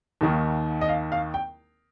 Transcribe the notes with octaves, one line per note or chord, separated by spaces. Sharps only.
D#2 D#3 A#3
D#5
F5
F5
G5